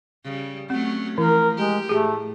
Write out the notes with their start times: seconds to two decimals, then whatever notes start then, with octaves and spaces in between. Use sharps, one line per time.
0.24 C#3 G3
0.70 F#3 A3 C4 C#4
1.18 E3 F3 E4 A#4
1.57 G#3 G4
1.89 A2 A3 G4 G#4